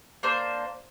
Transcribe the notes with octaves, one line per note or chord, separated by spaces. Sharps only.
A#3 D4 C5